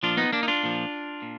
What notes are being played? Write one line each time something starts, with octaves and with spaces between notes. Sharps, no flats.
A#2 F3 D4 F4
B3 D#4
A#3 D4
D#4
D4 F4
A#2 F3
A#2